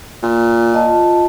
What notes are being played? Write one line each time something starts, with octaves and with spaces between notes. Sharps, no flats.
A#2
F4 D#5 A5